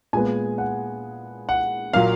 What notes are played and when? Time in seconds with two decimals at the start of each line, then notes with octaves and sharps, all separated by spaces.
0.13 A#2 G#3 B3 G#5
0.58 F#5
1.49 F#5
1.93 A#2 F#3 A#3 F5